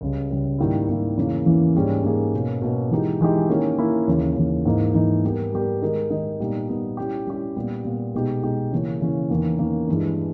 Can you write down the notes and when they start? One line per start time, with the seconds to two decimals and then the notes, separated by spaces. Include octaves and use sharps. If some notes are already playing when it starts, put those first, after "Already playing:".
0.01 C#2 C#3 G3
0.30 C#2 C#3 G3
0.58 G#2 D#3 G3 A#3 E4
0.88 G#2 D#3 G3 A#3 E4
1.17 E2 C#3 E3 A#3 C#4
1.46 E2 C#3 E3 A#3 C#4
1.75 G#2 G3 A#3 C#4 G#4
2.04 G#2 G3 A#3 C#4 G#4
2.33 B2 A#3 C#4
2.62 B2 A#3 C#4
2.91 E3 G#3 D#4 G4
3.21 E3 G#3 D#4 G4
3.49 D#3 A#3 C#4 E4
3.78 D#3 A#3 C#4 E4
4.08 D#2 C#3 E3
4.36 D#2 C#3 E3
4.65 G#2 E3 A#3 D#4
4.94 G#2 E3 A#3 D#4
5.24 G3 B3 G4 A#4
5.53 G3 B3 G4 A#4
5.82 D#3 G#3 D#4 A#4 D#5
6.10 D#3 G#3 D#4 A#4 D#5
6.40 A#2 G3 B3 D#4
6.68 A#2 G3 B3 D#4
6.97 G3 C#4 E4 G4
7.27 G3 C#4 E4 G4
7.56 A#2 G3 B3
7.85 A#2 G3 B3
8.14 B2 G#3 B3 D#4 G4
8.43 B2 G#3 B3 D#4 G4
8.71 C#3 E3 A#3 C#4
9.01 C#3 E3 A#3 C#4
9.30 E2 D#3 A#3 C#4
9.59 E2 D#3 A#3 C#4
9.88 G2 E3 G#3